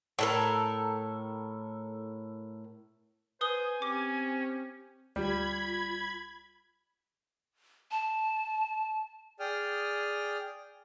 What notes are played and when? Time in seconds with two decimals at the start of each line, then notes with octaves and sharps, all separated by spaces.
0.19 A2 A4 A#4
3.41 B4 C5 G#5 D#6 G7
3.82 C4 C#4 G4 D6
5.16 D2 G3 F4 B5 G#6
7.91 A5
9.40 G#4 D5 G5 D#6 F6